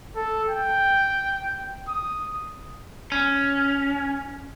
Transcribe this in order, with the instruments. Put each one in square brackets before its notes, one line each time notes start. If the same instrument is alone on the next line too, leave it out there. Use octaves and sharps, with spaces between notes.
[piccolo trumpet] A4
G5
D#6
[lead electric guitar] C#4